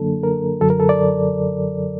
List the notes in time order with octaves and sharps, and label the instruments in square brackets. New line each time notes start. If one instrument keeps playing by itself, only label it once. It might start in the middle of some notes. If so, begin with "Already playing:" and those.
Already playing: [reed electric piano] F#2 D3 F#3 A#3 D4 A4
A#4
F#2 D3 F#3 A4
A#4
A4
D5